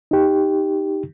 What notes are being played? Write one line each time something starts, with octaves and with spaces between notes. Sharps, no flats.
D#4 G4